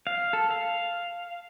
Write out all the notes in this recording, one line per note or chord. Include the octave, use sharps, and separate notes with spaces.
F5
A4
F5